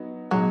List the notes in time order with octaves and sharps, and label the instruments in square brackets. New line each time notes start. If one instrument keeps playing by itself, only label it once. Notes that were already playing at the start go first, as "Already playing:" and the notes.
Already playing: [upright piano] F#3 B3 D#4
[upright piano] B2 G#3 D#4 [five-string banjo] F#3